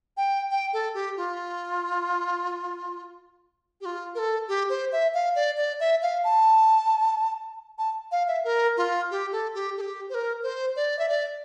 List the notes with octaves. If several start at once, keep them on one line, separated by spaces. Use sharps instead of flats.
G5
G5
A4
G4
F4
G4
F4
A#4
A4
G4
C5
E5
F5
D5
D5
E5
F5
A5
A5
F5
E5
A#4
F4
G4
A4
G4
A4
G4
C5
A#4
C5
D5
E5
D5